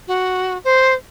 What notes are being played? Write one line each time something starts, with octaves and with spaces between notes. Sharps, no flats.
F#4
C5